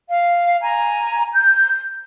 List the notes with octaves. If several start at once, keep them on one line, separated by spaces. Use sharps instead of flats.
F5
G#5 A#5
G6